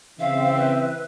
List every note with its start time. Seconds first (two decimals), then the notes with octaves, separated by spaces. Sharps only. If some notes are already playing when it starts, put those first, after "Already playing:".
0.19 C#3 E3 C4 E5 F5
0.57 B4